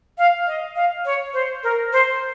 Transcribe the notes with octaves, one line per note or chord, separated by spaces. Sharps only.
F5
D#5
F5
C#5
C5
A#4
C5